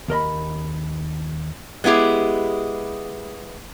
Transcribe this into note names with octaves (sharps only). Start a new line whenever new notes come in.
D#2 A#4 D#5 B5
G#3 B3 E4 G4 G#4